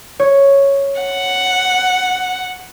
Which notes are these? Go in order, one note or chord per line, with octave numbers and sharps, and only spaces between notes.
C#5
F#5